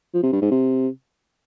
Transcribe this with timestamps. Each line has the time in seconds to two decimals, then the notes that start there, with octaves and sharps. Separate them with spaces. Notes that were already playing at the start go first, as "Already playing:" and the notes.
0.14 F3
0.23 C3
0.32 G2
0.42 G#2
0.51 C3